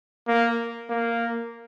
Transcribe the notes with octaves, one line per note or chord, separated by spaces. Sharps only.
A#3
A#3